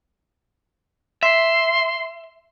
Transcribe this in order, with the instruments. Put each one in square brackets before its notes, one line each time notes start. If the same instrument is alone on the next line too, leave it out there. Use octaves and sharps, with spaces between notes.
[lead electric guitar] E5 [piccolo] C6